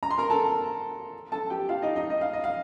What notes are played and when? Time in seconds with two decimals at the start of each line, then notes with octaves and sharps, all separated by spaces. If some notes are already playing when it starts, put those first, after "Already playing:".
0.03 A#5
0.11 C6
0.18 A#4 A#5
0.30 A4 A5
1.32 A4 A5
1.50 G4 G5
1.69 F4 F5
1.82 D#4 D#5
1.96 D#4 D#5
2.10 D#5
2.21 F5
2.33 D#5
2.44 F5